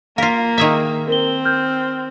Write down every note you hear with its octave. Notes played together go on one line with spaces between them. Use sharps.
A#3 F4 A#4 F5 B6
D#3 G#4 E5
C4 A#4 G7
F6 G6